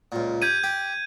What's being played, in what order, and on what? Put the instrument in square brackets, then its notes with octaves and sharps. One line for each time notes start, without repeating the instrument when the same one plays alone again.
[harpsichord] C#2 A#2
[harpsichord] G4 [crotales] G6 G#6 D#7
[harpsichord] G4